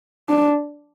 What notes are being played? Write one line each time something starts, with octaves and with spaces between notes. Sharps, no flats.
D4